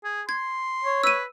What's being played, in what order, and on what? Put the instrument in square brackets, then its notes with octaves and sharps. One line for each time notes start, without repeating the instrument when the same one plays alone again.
[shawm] G#4
[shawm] C6 [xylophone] G#6
[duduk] C#5
[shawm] B4 [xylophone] E6 D#7